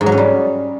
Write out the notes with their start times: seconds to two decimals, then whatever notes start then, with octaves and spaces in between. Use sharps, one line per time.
0.01 G#2
0.06 F#3
0.12 C#4
0.18 G3